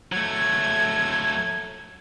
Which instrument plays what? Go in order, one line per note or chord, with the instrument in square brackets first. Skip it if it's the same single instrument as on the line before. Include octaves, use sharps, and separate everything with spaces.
[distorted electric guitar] F#3 A3 [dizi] G#6